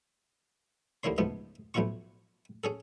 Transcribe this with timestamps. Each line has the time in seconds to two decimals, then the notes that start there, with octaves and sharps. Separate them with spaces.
1.03 D#2 D3 A#3 E4 C#5 C6
1.18 C#2 G#2 F3 A3 B3
1.74 B1 A2 F3 E4 F4 C#6
2.64 C#4 G#4 A4